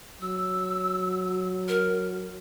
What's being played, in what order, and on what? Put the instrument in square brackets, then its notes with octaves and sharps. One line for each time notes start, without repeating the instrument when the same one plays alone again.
[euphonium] F#3 [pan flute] E6
[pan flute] A#4